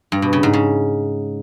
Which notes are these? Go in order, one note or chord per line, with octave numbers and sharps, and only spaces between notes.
G2
B2
C#3
G#2
C#3